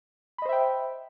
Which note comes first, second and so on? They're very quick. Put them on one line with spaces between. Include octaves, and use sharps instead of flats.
B5 D#5 C5 E5 G5